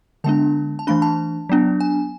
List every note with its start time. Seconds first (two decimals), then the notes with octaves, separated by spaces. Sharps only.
0.24 D3 G#3 B3 D4 A5
0.79 A5
0.87 E3 A3 D4 B5
1.02 A5
1.49 F#3 B3 D4
1.80 G#5